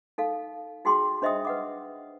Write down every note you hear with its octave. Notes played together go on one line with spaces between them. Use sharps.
D#4 A4 F5
D#4 F#4 G#4 G5 C6 D6
D4 C5 D#5 E5 G5 D#6
B4 F#5 D6